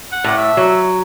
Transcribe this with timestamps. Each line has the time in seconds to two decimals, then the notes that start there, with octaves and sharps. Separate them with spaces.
0.12 F#5
0.24 A2
0.38 E5
0.57 F#3